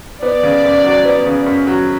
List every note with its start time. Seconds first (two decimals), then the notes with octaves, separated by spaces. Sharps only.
0.22 B3 D5
0.43 C#3
0.64 F#2
0.84 F#3
1.05 B3
1.26 C#3
1.46 F#2
1.67 F#3